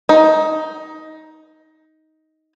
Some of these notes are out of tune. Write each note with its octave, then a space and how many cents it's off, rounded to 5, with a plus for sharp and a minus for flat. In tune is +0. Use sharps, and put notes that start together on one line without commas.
D#4 +15